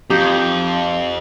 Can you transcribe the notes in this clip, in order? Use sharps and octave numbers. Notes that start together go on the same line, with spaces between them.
F2 D#4 G4